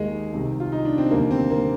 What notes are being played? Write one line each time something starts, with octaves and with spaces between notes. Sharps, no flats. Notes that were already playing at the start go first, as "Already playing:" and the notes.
Already playing: D#2 D#3 G#3 A#3
C2 C3 D#3
F4
D#4
D4
C4
F1 D#2 D3 A#3
C4
A#3